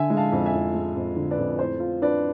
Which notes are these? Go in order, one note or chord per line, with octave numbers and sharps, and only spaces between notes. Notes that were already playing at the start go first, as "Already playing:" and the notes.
Already playing: D3 E5 G#5
G#3
F5 A5
F2
E5 G#5
F2
G#3
F2
D3
B4 D5
F2
A2 C5
F4
D4 B4 D5